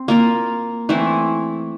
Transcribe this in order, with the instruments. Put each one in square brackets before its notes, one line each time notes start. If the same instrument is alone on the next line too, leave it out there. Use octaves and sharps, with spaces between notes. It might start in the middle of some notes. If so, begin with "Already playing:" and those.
Already playing: [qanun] C4
A#3 F4 A#4
E3 A3 C4 E4